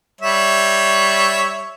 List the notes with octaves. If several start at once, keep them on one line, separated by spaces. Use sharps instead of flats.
G3 C#5 E5